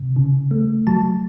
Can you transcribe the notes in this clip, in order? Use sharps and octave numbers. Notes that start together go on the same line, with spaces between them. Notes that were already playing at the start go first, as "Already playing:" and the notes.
Already playing: C3
C#3
A3
F#3 A5